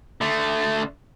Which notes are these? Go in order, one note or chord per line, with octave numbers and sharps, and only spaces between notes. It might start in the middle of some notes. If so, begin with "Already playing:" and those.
D3 A3